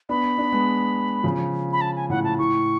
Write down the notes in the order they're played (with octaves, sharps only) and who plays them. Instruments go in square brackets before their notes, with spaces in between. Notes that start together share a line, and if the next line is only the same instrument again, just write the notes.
[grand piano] B3 D4 [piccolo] B5
[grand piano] B3 D4
G#3 B3
C#3 F3
[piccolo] B5
A5
G#5
[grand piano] A2 C#3 [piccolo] F#5
[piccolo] A5
[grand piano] A2 [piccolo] C#6